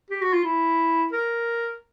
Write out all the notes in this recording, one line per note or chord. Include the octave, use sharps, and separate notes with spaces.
G4
F#4
F4
E4
A#4